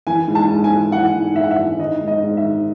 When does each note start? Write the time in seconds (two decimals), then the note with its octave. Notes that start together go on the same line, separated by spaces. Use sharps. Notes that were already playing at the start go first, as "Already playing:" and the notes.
0.07 E3 G#5
0.28 G#2
0.35 A5
0.50 G#2
0.64 G#5
0.71 E3
0.92 E3 F#5
1.15 G#2
1.36 G#2 E5
1.43 F#5
1.51 E5
1.57 E3
1.79 D#3 D#5
2.00 G#2
2.08 D#5
2.23 G#2
2.37 E5
2.43 D#3